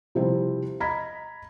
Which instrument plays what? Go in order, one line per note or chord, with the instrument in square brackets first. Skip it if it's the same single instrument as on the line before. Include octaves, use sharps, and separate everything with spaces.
[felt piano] C3 F3 G3 C4 E4 G#4
D#5 A#5 B5 G#6 B6